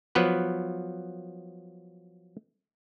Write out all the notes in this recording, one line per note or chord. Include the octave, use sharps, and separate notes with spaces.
F3 F#3 B3 B4